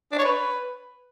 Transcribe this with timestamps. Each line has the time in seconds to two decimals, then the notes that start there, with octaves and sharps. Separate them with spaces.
0.12 D4
0.18 C#5
0.25 B4